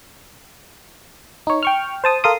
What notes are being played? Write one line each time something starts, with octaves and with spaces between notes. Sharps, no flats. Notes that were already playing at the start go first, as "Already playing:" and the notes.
D#4 C#5
G5 C#6 F6
C5 A5 D#6
A4 A#4 F5 C6 D#6